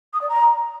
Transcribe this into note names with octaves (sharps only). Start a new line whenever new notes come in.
D#6
D5
A#5